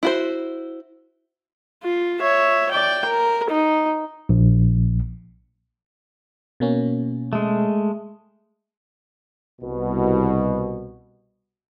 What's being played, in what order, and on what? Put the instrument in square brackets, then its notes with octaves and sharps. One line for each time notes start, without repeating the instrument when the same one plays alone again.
[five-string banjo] E4 F#4 C5
[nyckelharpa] F4
C#5 E5
D5 G5
A#4
D#4
[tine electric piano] A#1
[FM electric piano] B2 A#3 C#4
[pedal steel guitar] G#3 A3
[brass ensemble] C2 B2